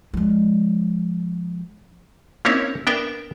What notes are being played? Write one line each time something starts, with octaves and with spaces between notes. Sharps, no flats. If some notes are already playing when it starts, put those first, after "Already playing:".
F3 G#3
A#3 C4 C#4 D#4 E4 C#5
B3 D4 A#4 D5 E5 G5